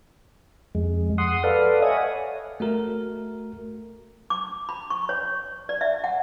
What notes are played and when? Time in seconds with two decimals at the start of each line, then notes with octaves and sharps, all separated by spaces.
0.75 F2 G#3
1.18 F#5 C6 D#6
1.44 A4 B4 D5 F5
1.82 C#5 D#5 E5 F#5 G#5 D#6
2.60 A3 F#4 A#4
4.30 D6
4.69 B5
4.90 C#6
5.09 C#5
5.69 D5
5.81 E5
6.04 F#5